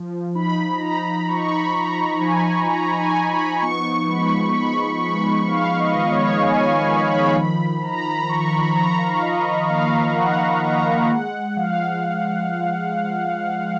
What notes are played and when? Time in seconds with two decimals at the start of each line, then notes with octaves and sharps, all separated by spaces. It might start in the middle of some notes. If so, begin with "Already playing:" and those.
Already playing: F3
0.35 D#4 B5
0.75 A#5
0.81 D#4 B5
1.05 B5
1.29 D#4 C#6
1.52 B5
1.75 F3 A#5
2.21 F3 G#5
2.68 F3 A#5
2.99 G#5
3.15 D#4
3.30 B5
3.62 B3 C#6
4.09 G#3 B5
4.56 B3 B5
5.02 G#3 B5
5.48 B3 F5
5.79 D#5
5.95 D#3
6.12 C#5
6.42 D#3 G#5
6.66 G#5
6.89 D#3 B5
7.12 B5
7.36 F3 B5
7.83 F3 A#5
7.97 B5
8.10 A#5
8.29 F3 C#6
8.52 B5
8.76 F3 A#5
8.99 F5
9.22 F3 D#5
9.70 A#3 F5
10.16 A#3 F#5
10.63 A#3 A#5
11.10 G#3 F#5
11.57 F3 F5